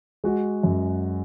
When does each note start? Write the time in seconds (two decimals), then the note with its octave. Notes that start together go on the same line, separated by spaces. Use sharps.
0.24 G#3 F#4
0.63 F#2